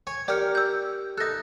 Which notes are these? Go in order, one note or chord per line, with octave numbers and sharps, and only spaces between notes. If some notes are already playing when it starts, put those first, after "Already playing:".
C#5 G#5
G4 A#4 D5 F6 C#7
E6 G6
D#4 A4 F#6 A#6